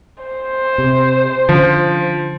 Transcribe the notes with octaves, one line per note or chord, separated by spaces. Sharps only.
C5
C3
D3 F3 C#4